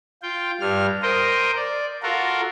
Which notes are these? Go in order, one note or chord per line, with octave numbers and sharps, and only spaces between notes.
F4 G5
G2 G3 F6
A#4 C5 D#5 G5
D5
F4 F#4 A4 A#4